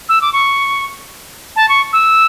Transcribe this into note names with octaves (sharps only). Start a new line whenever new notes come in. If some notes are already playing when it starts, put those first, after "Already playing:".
E6
D6
C#6
A5
C#6
E6